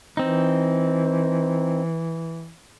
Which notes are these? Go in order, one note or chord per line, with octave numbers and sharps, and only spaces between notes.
E3 C4 D#4